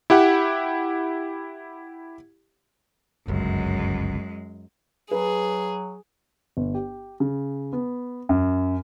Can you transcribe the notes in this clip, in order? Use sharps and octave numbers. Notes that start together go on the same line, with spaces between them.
E4 G4 F#5
G1 C#2 F#2 G#3
F#3 G#4 B4
G1
G4
C#3
B3
F#2